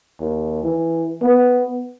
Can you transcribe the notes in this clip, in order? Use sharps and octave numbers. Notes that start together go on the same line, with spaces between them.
D#2
E3
B3